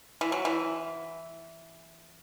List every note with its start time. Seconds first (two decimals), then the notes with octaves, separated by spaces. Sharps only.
0.21 E3
0.32 F#3
0.45 E3